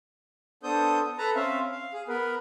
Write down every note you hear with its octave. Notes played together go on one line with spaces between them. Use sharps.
B3 D4 A4 C5 D#6 G6
A4 B4 A5 A#5
C4 C#4 E5 F5
F5
G#4
B3 A#4 B4